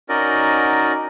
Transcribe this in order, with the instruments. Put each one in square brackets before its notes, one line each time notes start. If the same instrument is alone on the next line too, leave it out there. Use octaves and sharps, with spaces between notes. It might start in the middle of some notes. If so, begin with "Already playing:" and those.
[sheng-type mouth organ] C#4 D#4 F#4 A#4 D5 D#5